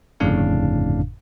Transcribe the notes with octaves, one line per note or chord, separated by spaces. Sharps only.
G1 F2 A2 C#3 D4 F5